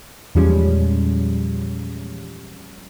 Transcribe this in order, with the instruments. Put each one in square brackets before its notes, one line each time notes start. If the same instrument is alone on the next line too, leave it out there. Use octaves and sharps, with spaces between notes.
[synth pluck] E2 A#2 F3 G3 G#3 C#4